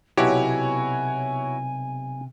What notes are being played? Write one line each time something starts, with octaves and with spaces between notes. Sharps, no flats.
B1 C3 E4 F#4 G4 C#5 G#5